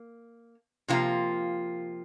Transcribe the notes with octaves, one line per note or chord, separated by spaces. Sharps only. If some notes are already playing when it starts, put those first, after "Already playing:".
Already playing: A#3
C3 F3 A#3 F4